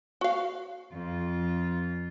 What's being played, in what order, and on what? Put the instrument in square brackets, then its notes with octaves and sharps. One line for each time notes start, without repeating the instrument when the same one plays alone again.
[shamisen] F#4 F5
[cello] F2 F4